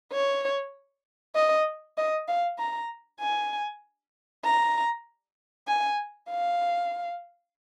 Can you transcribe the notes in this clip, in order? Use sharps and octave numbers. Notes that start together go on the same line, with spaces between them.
C#5
D#5
D#5
F5
A#5
G#5
A#5
G#5
F5